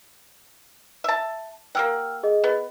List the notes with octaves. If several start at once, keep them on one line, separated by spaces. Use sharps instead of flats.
E5 A5
A#3 G4 F#5 G5 E6 F6
G#4 D#5
B3